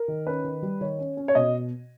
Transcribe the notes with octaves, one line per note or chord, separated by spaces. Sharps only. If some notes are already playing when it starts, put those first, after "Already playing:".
Already playing: A#4
D#3
C#4 B4
D#3
G3
D#3 C#5
C#4
C#4
C#5
B2 D#5